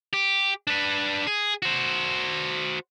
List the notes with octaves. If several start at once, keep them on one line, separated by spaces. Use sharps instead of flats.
G4
D4 B4
G#4
F#4 C5